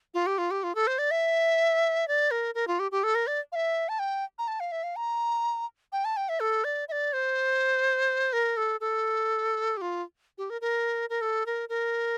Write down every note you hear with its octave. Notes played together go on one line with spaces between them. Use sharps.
F4
G4
F4
G4
F4
A4
C5
D5
E5
D5
A#4
A#4
F4
G4
G4
A4
A#4
D5
F5
E5
A5
G5
A#5
A5
F5
E5
F5
A#5
G5
A5
G5
E5
A4
D5
E5
D5
C5
A#4
A4
A4
G4
F4
G4
A#4
A#4
A#4
A4
A#4
A#4